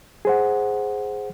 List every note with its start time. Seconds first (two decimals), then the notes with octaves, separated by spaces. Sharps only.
0.25 G#4 C5 F#5